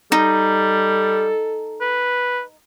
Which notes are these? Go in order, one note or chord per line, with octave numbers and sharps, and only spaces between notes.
G3 D#4 A4
B4